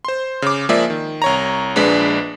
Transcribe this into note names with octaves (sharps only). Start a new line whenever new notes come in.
C5 C6
C#3 D6
F3 G#3 A#3 G#4 D5 E5
D#3
C2 C#5 A#5
A#1 G#3 D4 B4 B6